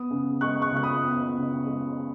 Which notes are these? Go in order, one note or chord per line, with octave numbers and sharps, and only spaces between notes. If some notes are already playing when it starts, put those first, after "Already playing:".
Already playing: B3 D#6
C#3
G#3 C#6 F#6
C#6 F#6
C#2 F#6
B5 D#6
B3
C#3
G#3